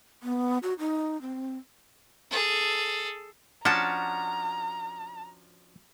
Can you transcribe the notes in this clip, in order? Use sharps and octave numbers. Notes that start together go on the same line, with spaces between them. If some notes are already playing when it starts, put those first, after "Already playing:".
B3
F#4
D#4
C4
G#4 A4
F3 C#4 D4 F#4 A5 A#5